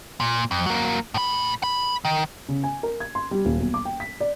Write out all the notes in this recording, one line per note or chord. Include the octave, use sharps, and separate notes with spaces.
A#2
F2
F#3 A#3
A2 B5
B5
D#3
C#3
G#5
A#4
G#6
C6
G3
D#1
B1
D6
G5
B6
D5